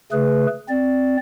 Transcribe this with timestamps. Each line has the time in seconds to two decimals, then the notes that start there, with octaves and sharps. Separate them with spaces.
0.12 C#3 A3 G#4 B4
0.69 C4 D5